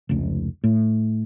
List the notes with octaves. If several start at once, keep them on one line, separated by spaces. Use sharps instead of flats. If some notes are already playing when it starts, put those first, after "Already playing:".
F1 C#2
A2